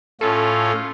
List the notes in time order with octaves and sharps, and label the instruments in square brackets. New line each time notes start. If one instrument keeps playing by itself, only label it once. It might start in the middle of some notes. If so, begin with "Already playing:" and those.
[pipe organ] A2 C#4 F4 [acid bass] A4